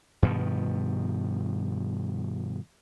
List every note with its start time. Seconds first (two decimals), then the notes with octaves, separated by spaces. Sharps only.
0.22 G2 B2 D#3 F3